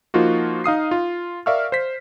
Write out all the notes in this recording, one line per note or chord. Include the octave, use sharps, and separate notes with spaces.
F3 A#3 D#4 F4 F#4
D#4 F5 D#6 C7
F4
A#4 D5 E5 F5 C#6 F6
C5 B6